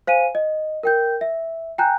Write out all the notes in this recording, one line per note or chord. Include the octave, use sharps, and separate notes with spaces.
C5 F5 G#5 D#7
D#5
A#4 G5 G6
E5
G5 G#5 A#5 F#6 G6